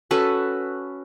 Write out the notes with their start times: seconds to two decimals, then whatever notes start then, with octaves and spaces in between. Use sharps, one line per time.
0.11 C#4 F#4 A4 B4